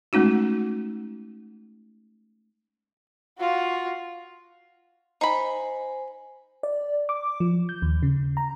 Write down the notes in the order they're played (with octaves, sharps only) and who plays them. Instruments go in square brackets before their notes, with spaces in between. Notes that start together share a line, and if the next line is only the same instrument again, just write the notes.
[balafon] G#3 A3 C#4 D#4 F#4
[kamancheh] F4 F#4
[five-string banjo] D#4 B5 [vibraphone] C5 G#5
[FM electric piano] D5
D6
F3
G6
D#2
C#3
A#5